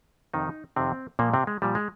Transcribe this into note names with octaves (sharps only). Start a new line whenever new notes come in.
F2 C3 D#3 D#4
F2 C3 D#3 C4
A#2 F3 A#3
C3 C4
G#3
A#2 F3 G3
G#3